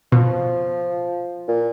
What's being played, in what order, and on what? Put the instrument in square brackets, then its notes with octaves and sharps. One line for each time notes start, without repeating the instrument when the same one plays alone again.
[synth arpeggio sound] B2 [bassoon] F3
[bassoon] A#2